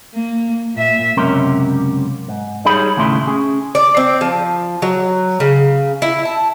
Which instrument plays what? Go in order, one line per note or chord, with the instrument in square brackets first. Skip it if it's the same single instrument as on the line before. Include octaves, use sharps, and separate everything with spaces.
[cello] A#3
A#2 E5
[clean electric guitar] C#2 F#2 C3 C#4 A#4 C6
G#2
G3 D#4 G#4 C#5 B5
D#2 A2 C#3 E4 B5 C6
C#4 G#4
[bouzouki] D5
C4
F3
F#3
C#3
E4
A5